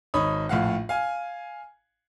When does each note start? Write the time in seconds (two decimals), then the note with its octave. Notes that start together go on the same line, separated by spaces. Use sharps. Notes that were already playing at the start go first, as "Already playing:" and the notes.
0.14 G#1 D#4 C#5 B5 D#6
0.49 A#1 A2 F5 F#5
0.89 F5 G#5